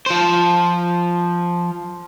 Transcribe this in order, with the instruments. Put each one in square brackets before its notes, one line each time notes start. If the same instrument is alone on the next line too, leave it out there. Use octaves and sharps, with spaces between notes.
[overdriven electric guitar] F3 C5